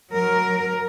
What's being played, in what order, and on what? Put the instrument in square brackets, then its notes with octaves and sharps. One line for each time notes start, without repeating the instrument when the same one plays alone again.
[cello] F#3 A#4